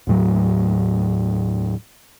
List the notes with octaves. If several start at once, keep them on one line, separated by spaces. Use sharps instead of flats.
D#2 A2 F#3